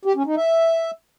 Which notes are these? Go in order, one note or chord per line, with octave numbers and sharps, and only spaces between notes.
G4
C#4
D#4
E5